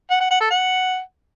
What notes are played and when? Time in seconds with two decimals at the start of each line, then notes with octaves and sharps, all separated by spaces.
0.10 F#5
0.20 F#5
0.30 F#5
0.40 A4
0.50 F#5